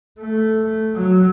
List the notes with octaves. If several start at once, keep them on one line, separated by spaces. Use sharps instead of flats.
A3
F#3